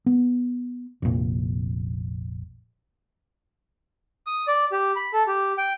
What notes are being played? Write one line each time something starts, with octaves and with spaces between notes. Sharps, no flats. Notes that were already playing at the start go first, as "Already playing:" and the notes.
B3
F1 A#1
D#6
D5
G4
B5
A4
G4
G5